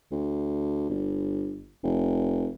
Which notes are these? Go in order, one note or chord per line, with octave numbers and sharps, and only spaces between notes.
D2
G1
F1